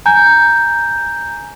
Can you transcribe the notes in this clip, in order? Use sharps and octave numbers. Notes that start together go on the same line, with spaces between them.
G#5 A#5 G6